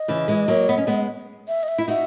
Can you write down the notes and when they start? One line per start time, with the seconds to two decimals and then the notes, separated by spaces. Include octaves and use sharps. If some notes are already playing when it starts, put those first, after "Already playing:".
Already playing: D#5
0.08 C#3 E3
0.28 E3 G#3
0.48 F#3 A#3
0.69 B3
0.78 C#4
0.87 G#3 B3
1.48 E5
1.63 D#5
1.68 E5
1.78 E4
1.88 D#4 F#4 E5